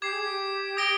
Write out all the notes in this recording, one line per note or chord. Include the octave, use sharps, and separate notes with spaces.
G4 D6 G#6 C7
G#4
G4
D#6 A#6 D7 G7